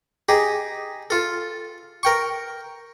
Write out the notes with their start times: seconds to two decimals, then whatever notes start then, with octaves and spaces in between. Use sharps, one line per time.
0.29 D#4 G4 G#4
1.10 F4 A4
2.03 A#4 G5 C#6